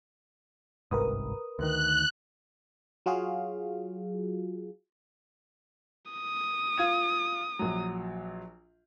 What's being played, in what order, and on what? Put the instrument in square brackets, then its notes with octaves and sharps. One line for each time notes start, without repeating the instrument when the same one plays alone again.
[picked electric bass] G1 C2 G#2 [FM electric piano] A#4 B4 D#6
[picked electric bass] D2 D#3 [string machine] F#6
[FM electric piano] F#3 F4 F#4 G#4 F5
[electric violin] D#6
[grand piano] F4 G#6 D#7
A#1 F#3